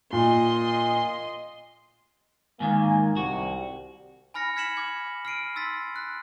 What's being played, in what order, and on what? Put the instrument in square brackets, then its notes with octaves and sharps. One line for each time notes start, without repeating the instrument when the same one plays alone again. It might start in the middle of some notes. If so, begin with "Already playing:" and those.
[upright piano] A#2 [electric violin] D#5 C6
[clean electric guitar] G#2 D#3 [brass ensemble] A#3 G#5
[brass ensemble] C2 [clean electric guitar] F#4
[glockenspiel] G#5 B5 F6 A#6 C#7
F6 G#6 B6 C#7 E7 F#7
D6 G#6
F6 C7 D7 D#7
C6 E6 A6 B6
F#6